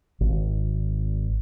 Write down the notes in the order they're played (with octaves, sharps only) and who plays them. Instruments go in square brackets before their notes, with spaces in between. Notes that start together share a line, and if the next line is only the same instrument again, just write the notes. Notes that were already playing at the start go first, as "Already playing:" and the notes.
[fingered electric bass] G#1